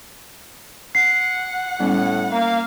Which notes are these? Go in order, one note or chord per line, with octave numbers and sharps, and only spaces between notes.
F#5 C7
A2 G3 B3 C#4
A#3 F5 A#5